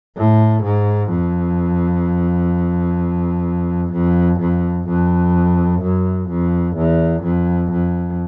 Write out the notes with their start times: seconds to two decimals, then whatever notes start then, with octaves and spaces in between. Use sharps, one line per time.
0.17 A2
0.64 G#2
1.11 F2
3.93 F2
4.40 F2
4.88 F2
5.82 F#2
6.29 F2
6.77 E2
7.23 F2
7.72 F2